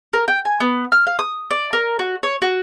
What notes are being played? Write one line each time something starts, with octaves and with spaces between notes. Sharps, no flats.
A#4
G5
G#5
B3
F6
F5
D#6
D5
A#4
F#4
C#5
F#4